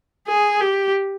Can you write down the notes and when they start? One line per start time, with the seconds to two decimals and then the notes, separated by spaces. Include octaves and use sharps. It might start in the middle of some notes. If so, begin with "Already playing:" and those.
0.28 G#4
0.61 G4